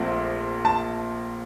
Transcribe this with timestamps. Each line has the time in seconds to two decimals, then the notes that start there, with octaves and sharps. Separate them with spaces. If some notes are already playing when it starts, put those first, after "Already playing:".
Already playing: A#1 A#2 F3 A3 C4
0.65 A5